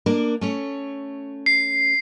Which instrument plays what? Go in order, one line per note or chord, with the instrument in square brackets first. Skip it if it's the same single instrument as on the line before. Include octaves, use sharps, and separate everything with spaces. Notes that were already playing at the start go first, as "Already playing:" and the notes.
[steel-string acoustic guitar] A#3 D4 A#4
A3 C#4 C#5
[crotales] C7